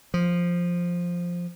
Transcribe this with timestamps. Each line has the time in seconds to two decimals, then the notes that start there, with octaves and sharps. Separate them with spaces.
0.14 F3